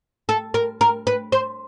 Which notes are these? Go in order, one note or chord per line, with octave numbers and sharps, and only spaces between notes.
A4
A#4
A#4
B4
C5